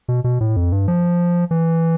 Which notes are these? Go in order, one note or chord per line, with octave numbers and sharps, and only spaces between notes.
B2
B2
A2
F2
G2
F3
E3